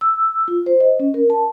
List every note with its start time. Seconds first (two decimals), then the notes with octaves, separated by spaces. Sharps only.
0.01 E6
0.48 F4
0.66 C5
0.80 D#5
1.00 C#4
1.14 A#4
1.30 A5